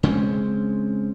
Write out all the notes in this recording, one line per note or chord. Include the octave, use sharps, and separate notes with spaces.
C#3 G#3 C4 C#4